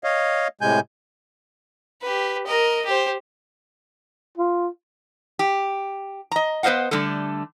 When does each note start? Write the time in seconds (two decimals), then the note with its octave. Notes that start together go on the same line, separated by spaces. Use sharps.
0.04 C#5 D#5 F5
0.61 A2 C3 G#3 G#5 G6
2.02 G4 B4
2.47 A#4 D#5
2.86 G4 C5
4.38 F4
5.39 G4
6.32 D#5 A#5
6.63 B3 B4 C5 D#5 F5 F#5
6.91 D3 G3 A3 A4